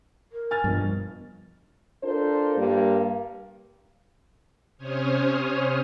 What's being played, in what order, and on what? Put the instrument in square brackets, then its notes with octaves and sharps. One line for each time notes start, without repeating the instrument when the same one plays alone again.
[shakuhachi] A#4
[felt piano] G#5 F6 A6
[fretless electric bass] G2 [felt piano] B2 F3
[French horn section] D4 F4 A4 A#4 C5
G2 G3 A#3
[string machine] C3 C#4 C5 C#5 D#6 F6